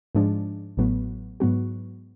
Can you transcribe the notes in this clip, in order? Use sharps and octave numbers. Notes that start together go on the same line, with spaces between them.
G#2 F3 G#3 D4
A1 A2 F#3 B3
G#2 F#3 B3 F#4